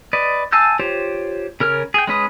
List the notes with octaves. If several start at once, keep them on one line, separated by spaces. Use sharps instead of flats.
B4 D5 D#5
F5 G#5 A5 E6 G6
F4 G4 C5 C#5
C#3 A#4 C#5 F6
G#4 G5
G#3 C#4 B4 D#6